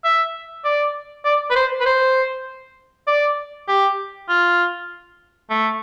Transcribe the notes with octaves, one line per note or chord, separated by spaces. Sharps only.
E5
D5
D5
B4
C5
B4
C5
D5
G4
F4
A3